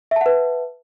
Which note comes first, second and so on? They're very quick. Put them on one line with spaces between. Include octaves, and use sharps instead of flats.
E5 A5 F#5 B4